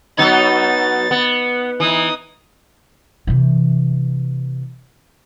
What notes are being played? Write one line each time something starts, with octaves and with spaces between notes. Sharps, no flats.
F#3 B3 D#4 A6
B3
E3 D#4 D#6
C3 E3